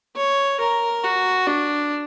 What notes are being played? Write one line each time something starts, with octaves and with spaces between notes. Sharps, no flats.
C#5
A#4
F#4
D4